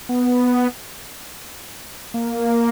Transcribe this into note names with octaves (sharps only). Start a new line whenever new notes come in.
B3
A#3